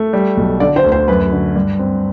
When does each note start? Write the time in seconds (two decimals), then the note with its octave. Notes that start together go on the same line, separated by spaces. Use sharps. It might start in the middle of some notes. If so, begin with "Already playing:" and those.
Already playing: A3
0.13 G3
0.37 B1
0.60 D3 D5
0.76 C5
0.85 D2
0.92 C5
1.08 F#2 B4
1.32 D3
1.56 G2
1.79 C4